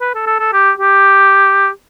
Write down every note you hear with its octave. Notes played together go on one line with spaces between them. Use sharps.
B4
A4
A4
A4
G4
G4